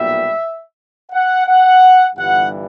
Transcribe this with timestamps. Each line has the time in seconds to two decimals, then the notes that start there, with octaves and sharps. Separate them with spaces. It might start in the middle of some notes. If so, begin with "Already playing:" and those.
Already playing: B1 A#2 G3 B3 E5
1.12 F#5
1.47 F#5
2.16 G1 G2 E3 G3 F#5